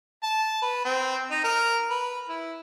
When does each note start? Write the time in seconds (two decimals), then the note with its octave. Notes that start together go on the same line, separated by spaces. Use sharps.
0.23 A5
0.63 B4
0.85 C4
1.31 D#4
1.44 A#4
1.90 B4
2.29 E4